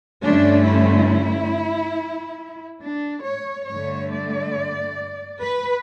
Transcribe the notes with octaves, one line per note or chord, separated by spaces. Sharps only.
G2 D3 A3 C#4 D4
E4
D4
C#5
G2 D3 A3 C#5
D5
B4